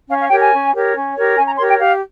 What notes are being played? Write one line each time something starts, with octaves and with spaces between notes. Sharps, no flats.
C#4 F5
F5
G4 A#4 C#5 G5
G#5
C#4
G4 A#4 C#5
C#4
G4 A#4 C#5
C#4 G#5
A#5
G4 A#4 C#5 C6
G5
G4 F5